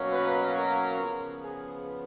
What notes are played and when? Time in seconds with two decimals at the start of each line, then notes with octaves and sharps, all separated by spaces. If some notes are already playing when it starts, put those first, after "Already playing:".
Already playing: B2 F#3 A#3 C#4
0.10 B4
0.54 A#4
0.98 C#3 F3 B3
1.42 G#4